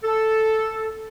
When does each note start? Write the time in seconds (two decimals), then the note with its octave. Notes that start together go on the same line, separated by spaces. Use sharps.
0.04 A4